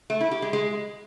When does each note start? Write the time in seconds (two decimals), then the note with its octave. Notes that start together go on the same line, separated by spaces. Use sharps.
0.10 A3
0.21 E4
0.31 G4
0.42 G#3
0.53 G#3